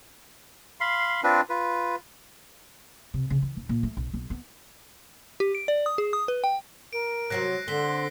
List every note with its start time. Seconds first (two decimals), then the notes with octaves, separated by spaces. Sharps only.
0.80 F5 B5 C6
1.24 C4 D4 F4 B4
1.49 F4 B4
3.14 C3
3.30 C#3
3.42 E3
3.57 D#1
3.69 A#2
3.83 A3
3.97 B1
4.13 B1
4.30 B3
5.40 G4
5.55 D7
5.68 D5
5.86 D#6
5.98 G#4
6.13 D#6
6.28 B4
6.44 G5
6.93 A#4 D7
7.30 C3 F#3 C4 F#6 A#6 C7
7.68 D3 C4 C6 B6 G7